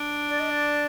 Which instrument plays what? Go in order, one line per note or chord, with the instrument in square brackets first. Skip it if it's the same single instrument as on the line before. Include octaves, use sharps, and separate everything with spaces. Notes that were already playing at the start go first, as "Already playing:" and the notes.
Already playing: [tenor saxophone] D4
[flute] D5
D#5
D5